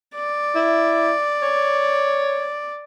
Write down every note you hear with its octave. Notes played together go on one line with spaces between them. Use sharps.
D5
E4
C#5